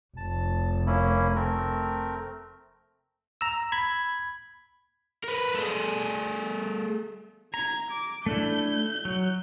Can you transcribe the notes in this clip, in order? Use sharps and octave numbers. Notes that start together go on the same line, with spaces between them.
F1 A5
A#3 C#4 E4
A3 C4 A#4
A#5 E6
B5 G#6
A#4 B4
A3 G#4
A#5 G#6
D6
A3 D4 E4 G6
F#3